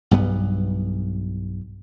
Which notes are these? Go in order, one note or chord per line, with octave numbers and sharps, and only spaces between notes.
B1 G2 G3 B3